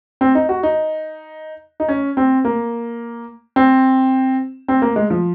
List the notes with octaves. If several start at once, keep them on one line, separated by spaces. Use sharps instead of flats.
C4
D#4
F#4
D#4
D#4
C#4
C4
A#3
C4
C4
A#3
G#3
F3